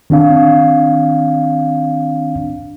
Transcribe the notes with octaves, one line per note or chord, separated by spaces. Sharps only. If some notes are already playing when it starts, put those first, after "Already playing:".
D#3 C4 D4 F5